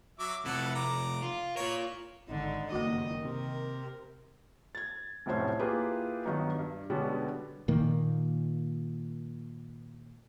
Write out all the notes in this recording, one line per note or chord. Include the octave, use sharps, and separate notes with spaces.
F#3 E5 D6
F2 C3 E4 A4 F#5
A#5 D6
F4
F4 A#4 C#5
G#1 D3 D#4
F#1 G2 D#3 A#3 F#4 D#5
C3 A#4
G#6 A6
F1 B1 A2 C#4 C5 G#6
A#3 E4 F4 G4 G#4 B4
G2 D#3 F#3 B3 D#4
G2
B2 D3 G3 G#3 B3 C#4
A#2 D#3 A#3